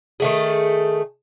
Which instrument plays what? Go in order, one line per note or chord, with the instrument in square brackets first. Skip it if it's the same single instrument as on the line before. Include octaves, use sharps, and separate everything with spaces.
[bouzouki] D#3 A3 G#4